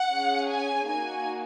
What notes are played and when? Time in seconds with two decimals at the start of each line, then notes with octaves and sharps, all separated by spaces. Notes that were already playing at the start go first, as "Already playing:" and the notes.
Already playing: F#5
0.11 C#4 G#4
0.49 G#5
0.87 A#3 D#4 F#4 G#5